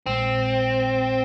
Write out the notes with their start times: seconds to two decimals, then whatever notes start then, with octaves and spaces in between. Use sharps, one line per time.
0.06 A#1 A#2 G#3 C4